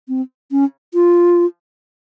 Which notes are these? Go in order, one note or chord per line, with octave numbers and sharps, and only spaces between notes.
C4
C#4
F4